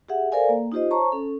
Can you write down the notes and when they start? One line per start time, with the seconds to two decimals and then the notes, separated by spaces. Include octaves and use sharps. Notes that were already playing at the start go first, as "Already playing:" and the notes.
0.09 G4 G#4 E5 F#5
0.32 A4 A#4 C5 D5 F5 G#5
0.49 A#3
0.72 D#4 F4 G4 C5 D#5
0.91 C5 C#5 A5 A#5 C#6
1.12 C#4 A4